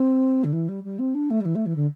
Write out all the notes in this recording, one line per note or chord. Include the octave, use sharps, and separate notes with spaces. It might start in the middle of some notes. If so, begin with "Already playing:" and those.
Already playing: C4
D3
E3
G3
G3
C4
D4
A3
G3
E3
A3
E3
D3